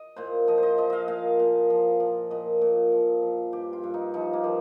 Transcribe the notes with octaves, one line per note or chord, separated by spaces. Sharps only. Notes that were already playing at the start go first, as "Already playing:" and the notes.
Already playing: D#5
A#2 C5
F3 D#5
C5
D#5
F3 D#5
D#5 F5
A#2 F5
A#2
F3
F3
A#2 D#5
A#2
F3
F3
G2 G4
F4
G2
D#4
F3 D#4
A#3
F3